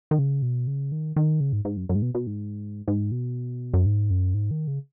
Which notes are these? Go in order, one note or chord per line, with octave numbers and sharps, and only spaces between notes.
D#3
C#3
B2
C#3
D#3
D#3
C#3
G#2
G#2
F#2
F#2
G#2
B2
B2
G#2
G#2
B2
F#2
G#2
F#2
G#2
D#3
C#3